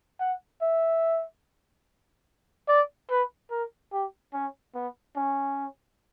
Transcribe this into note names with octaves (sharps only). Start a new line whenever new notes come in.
F#5
E5
D5
B4
A#4
G4
C#4
B3
C#4